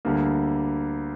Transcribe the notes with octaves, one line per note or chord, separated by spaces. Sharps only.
D2 D3 G3 A#3